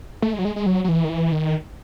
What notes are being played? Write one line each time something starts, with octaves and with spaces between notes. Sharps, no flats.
A3
G#3
F#3
G#3
G#3
F#3
F#3
E3
D#3
E3
D#3